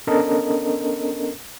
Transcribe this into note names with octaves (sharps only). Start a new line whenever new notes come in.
B3 C#4 D4 A4 A#4 D#5